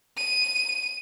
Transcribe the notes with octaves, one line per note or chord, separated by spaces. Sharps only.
D#7